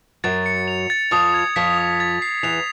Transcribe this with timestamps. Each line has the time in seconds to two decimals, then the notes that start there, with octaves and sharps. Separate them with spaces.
0.24 F#2 F#3 A6
0.46 C#7
0.68 F7
0.90 A6
1.11 F2 F3 D#6
1.34 G#6
1.56 F2 F3 B6
1.78 D#6
2.00 A6
2.22 C7
2.43 E2 E3 F7